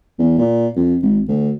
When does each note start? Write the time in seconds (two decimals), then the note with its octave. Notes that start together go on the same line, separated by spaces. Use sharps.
0.19 E2
0.38 A#2
0.76 F2
1.02 G#1
1.28 D2